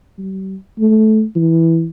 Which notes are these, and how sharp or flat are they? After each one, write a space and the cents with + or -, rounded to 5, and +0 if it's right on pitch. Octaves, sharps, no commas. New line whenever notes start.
G3 -40
A3 -15
E3 -5